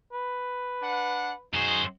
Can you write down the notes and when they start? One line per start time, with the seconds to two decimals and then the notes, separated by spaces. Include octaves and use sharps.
0.13 B4
0.82 D4 F#5
1.54 F#2 D#4 F#4 G#4 C5